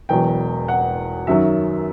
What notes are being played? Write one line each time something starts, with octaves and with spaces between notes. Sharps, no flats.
E1 E2 B2 F#3 G5
F#5
F#2 D#3 F#3 E5